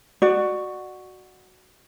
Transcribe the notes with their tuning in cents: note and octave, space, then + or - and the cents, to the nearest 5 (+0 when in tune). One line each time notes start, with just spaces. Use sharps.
F#4 +0 D5 +30